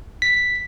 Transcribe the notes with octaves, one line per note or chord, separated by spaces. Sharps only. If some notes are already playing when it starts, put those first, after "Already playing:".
B6